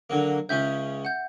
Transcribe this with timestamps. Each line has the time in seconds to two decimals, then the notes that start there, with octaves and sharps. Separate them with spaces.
0.10 D3 F#3 A#3
0.49 C#2 C#3 C#4 E5 G6
1.05 F#5 G6